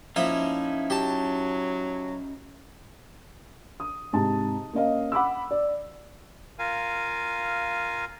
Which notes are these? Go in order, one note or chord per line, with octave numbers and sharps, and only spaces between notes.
F3 A#3 C#4 D#4 E4 E5
F#3 G4 A5
D#6
G#2 C3 A5
A#3 C#4 D#5 F5
F#5 B5 D6 E6
D5
F4 A#4 F5 G#5